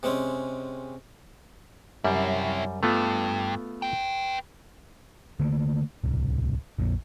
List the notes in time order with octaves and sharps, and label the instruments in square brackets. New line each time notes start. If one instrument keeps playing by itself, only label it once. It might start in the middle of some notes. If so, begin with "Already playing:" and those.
[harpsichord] C3 G#3 C4 C#4
[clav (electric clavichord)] F#2 G3 [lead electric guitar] C3 E4
[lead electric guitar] G2 [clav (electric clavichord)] A3 B3 F4
[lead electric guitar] B4 G5
[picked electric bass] D3 A3 A#3
D1 C2
A#1 F2 A#2